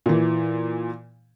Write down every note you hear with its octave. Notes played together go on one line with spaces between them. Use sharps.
A#2 E3